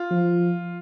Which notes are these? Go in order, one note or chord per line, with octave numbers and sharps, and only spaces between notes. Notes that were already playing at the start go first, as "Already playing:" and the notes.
Already playing: F4
F3